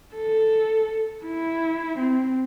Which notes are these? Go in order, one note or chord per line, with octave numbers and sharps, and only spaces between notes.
A4
E4
C4